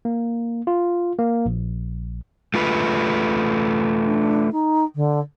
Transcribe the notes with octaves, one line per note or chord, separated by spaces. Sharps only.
A#3
F4
A#3
A#1
A3 F4 B4
D4
D#4
D3